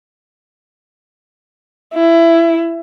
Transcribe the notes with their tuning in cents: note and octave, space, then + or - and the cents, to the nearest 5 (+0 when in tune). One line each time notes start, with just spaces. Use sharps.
E4 +20